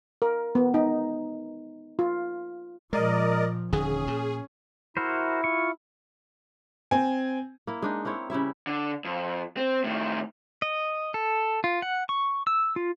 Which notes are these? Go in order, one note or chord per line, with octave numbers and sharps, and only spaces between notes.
A#4
B3
D#4
F4
A#2 F3 G#3 A#4 D5 D#5
D#1 D3 D#3 C#4 G#4
A#2
E4 F#4 A#4 C5
F4 C#6
C4 G#5
A#3 E4
G#3 D4 D#4
A#3 C4 E4 C#5
C#3 G3 E4 E5
D3
F2
C4
A2 D#3
D#5
A4
F4
F#5
C#6
E6
F4